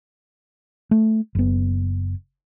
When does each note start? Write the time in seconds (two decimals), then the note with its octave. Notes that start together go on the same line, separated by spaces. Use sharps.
0.91 A3
1.35 F#1 B3